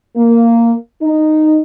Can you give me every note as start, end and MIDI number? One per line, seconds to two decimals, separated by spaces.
0.16 0.74 58
1.02 1.62 63